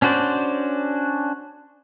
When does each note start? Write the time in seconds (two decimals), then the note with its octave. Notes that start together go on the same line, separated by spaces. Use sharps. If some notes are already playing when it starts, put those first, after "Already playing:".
0.02 C#4 D4 F#4 C5 D5